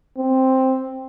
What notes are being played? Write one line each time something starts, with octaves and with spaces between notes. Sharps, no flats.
C4